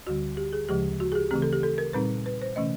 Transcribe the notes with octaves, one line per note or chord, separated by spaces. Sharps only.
D2 D3 G3 F#4
G4
G#4
D2 C#3 F3 G#3 G4
F#4
G#4
G4
C#3 E3 A3 C4 G4
A4
G4
A4
A#4
A#2 G3 C4 D#4 B4
B4
C5
C3 E3 A3 C#4 D#5